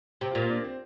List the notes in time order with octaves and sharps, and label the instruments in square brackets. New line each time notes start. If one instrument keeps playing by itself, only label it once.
[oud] C3 [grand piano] G4
[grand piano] F4
[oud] A#2
[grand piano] F4
D4
C4